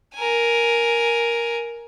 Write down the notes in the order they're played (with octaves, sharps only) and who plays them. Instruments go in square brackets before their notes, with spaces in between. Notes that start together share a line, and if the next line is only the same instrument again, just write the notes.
[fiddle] A#4 G#5